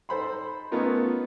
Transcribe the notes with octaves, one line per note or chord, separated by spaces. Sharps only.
D#4 A4 C5 B5 C6
A3 B3 C#4 D#4 F4 A#4